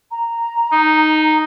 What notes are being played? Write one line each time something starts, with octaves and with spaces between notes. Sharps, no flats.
A#5
D#4